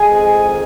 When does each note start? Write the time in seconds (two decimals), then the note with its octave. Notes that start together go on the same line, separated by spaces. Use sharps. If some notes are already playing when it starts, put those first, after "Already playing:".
Already playing: G#3 G#4 G#5
0.09 F2
0.48 D#3